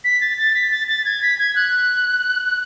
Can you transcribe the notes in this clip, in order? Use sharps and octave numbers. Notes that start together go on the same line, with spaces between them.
B6
A6
A6
B6
A6
A6
G#6
B6
G#6
F#6
F#6